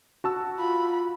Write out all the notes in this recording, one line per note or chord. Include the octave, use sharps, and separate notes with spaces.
F#4 A5 E6
F4 B5